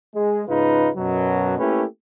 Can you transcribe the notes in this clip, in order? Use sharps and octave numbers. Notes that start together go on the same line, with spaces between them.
G#3
G#2 C#3 D#4 F4 B4
F#2 B2 F#3
A3 A#3 C#4 E4 G4 B4